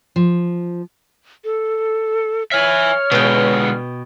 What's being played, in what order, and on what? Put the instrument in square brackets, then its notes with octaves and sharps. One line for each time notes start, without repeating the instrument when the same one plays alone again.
[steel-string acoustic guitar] F3
[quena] A4
[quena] C#5 [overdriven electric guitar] E5 G#5 [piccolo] F6
[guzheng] B2 G5 [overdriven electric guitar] D3 G#3